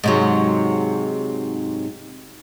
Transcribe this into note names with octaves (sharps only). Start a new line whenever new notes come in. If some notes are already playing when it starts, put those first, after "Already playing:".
G#2 C3 F#3